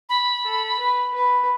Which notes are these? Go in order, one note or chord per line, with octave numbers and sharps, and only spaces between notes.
B5
A4
B4
B4